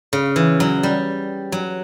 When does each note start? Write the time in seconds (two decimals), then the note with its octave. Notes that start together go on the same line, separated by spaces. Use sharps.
0.13 C#3
0.36 E3
0.60 F#3
0.83 G3
1.52 F#3